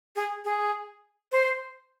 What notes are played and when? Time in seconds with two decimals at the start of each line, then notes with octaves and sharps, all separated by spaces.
0.16 G#4
0.45 G#4
1.32 C5